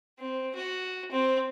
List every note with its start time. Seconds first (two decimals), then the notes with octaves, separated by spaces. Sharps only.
0.19 C4
0.55 F#4
1.12 C4